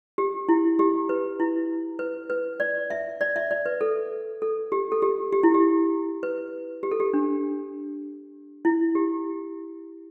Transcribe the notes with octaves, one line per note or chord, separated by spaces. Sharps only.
G4
E4
G4
B4
E4
B4
B4
D5
E5
D5
E5
D5
B4
A4
A4
G4
A4
G4
G4
E4
G4
B4
G4
A4
G4
D4
E4
G4